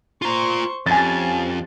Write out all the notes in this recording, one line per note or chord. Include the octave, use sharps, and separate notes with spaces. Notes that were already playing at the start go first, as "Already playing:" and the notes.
F4 C5 A#5 C#6
F2 C#4 G4 G#5 A6